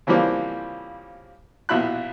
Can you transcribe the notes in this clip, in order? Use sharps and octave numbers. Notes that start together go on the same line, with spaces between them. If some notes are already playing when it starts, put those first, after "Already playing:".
C#3 E3 F3 G3 A#3 C4
A#1 B2 E4 F4 B5 F#6